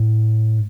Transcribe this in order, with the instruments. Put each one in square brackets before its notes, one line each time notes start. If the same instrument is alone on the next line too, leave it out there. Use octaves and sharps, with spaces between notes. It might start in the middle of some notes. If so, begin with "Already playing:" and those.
Already playing: [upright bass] A2